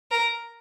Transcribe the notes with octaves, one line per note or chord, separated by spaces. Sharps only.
A#4